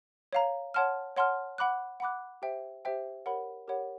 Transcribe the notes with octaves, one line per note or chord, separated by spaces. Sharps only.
C#5 F5 A#5
C#5 F#5 A5 C6 F6
C#5 F#5 A5 C6 F6
F#5 B5 D6 F#6
F#5 B5 D6 F#6
G4 C5 E5 G5
G4 C5 E5 G5
G4 A#4 C#5 F#5 B5
G4 A#4 C#5 F#5 B5